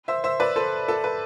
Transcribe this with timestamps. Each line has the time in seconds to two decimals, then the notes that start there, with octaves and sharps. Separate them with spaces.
0.08 C5 E5
0.24 C5 E5
0.40 B4 D5
0.56 A4 C5
0.88 A4
1.04 B4